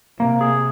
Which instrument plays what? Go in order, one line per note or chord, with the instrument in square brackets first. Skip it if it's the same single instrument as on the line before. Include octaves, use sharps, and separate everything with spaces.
[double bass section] C3 [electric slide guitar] A#3
[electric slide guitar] G#4